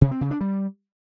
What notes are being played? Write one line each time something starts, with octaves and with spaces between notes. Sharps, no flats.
C3
C4
C#3
D4
G3